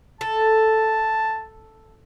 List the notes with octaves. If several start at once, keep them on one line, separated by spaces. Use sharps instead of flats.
A4 A5